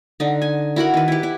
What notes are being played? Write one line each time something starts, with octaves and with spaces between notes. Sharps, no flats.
D3 D#4
G#5
E4 F#4 A#4 B5
D#3 B4
E4 G4
E4